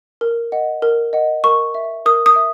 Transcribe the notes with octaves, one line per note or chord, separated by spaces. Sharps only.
A#4
D#5 F#5
A#4
D#5 F#5
A#4 C#6
E5
A#4 D#6
D#6
E5